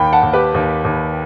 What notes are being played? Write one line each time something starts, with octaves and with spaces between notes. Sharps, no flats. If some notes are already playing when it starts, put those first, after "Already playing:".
Already playing: D#2 G5 B5
F#5 A5
D#2
G4 B4
D#2
D#2